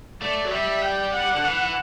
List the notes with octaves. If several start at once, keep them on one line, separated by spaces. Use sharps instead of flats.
A3 D5
F#3
G3 E5
G5
F#5
D3
E3